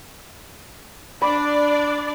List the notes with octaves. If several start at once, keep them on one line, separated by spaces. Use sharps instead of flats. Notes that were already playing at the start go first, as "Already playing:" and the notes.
D4 D5 B5